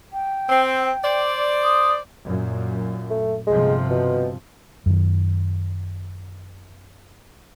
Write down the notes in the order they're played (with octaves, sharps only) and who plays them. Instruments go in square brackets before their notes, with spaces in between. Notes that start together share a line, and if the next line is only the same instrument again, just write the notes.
[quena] G5
[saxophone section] C4
C5 D5
[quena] D#6
[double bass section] F#2 A#2
[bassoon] A3
[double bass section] G1 C3 F3 [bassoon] G#3
[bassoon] B2
[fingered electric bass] F#2 D#3